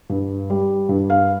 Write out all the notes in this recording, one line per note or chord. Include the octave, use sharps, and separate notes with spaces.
G2
G3
G2
F5